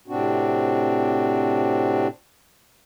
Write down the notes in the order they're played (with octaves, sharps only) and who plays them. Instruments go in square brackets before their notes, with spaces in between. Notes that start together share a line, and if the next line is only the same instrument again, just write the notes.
[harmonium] A2 C3 C4 D4 F#4